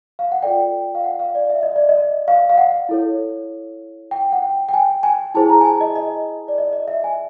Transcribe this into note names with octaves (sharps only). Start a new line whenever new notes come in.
F5
F#5
F4 A4 D5 G5
F5
F#5
F5
D5
E5
D#5
D5
D#5
F5
F5
F#5
E4 A4 C#5
G5
F#5
G5
G5
G#5
G#5
E4 G#4 C5 A5
A#5
G#5
A5
D#5
D#5
D5
D#5
D#5
E5
G#5